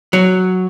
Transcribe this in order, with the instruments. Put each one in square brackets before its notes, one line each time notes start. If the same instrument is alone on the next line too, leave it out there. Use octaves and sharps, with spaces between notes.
[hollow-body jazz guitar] F#3